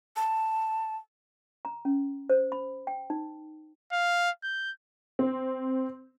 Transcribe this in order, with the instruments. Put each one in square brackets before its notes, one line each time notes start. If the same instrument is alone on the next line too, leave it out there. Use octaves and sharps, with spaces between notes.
[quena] A5
[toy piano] A#5
C#4
C5
B5
G5
D#4
[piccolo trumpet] F5
G6
[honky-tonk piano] C4